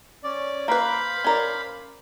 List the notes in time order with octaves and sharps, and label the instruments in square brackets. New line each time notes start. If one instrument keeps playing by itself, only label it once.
[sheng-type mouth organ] C#4 D5
[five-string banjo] A#3 B4 [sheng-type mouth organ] C5 F5 B5
[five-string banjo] C#4 A#4 D5